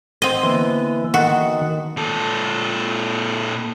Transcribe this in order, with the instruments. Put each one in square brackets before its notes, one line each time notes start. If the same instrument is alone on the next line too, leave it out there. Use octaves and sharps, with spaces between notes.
[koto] C4 D#5
[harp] D3 A#3 B3 [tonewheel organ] E3
[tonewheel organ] D#3 [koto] F#4 [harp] A4
[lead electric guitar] A#2 A4